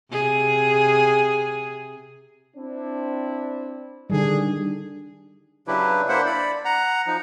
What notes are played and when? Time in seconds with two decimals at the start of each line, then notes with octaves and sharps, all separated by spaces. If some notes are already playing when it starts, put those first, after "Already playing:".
0.11 C3 G#4
2.57 C4 D4 E4
4.10 D3 D#3 G3 D4 G#4
5.67 C#3 F#3 D4 E4 G4 B4
6.08 A#3 D4 E4 C5 E5 F#5
6.26 D5 B5
6.65 F#5 A#5
7.07 F3 D#4